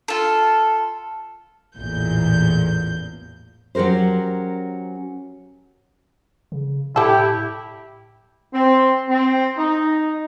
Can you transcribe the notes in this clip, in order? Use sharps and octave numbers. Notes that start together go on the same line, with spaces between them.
F4 A4
A1 E2 A#2 G6
F#3 C#4 G4 A#4 C5
C#3
A2 G3 E4 G4 A4
C4
C4
D#4